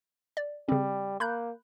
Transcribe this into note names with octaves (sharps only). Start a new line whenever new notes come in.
D5
C#3 G3 C4
A#3 B5 F#6 G6